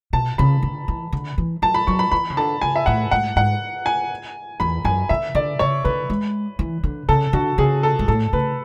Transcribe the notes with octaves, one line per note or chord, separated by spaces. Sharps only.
B2 A5
C#3 B5
D3
E3
D3
E3
F#3 A5
B5
F#3 C#6
B5
E3 B5
C#3
D3 A5
C#3 G#5
E5
A2 F#5
G#2 F#5
G#2 F#5
G#5
E2 B5
F#2 G#5
D3 E5
D3 D5
C#3 C#5
D3 B4
G#3
E3
D3
C#3 A4
D3 F#4
C#3 G#4
A4
G#2
A2 A4
C#3 B4